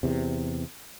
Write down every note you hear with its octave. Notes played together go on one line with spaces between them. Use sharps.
E2 C3